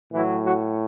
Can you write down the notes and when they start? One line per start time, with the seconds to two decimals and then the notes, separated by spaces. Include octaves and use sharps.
0.12 A2 E3 F#3 E4
0.42 F#3 F#4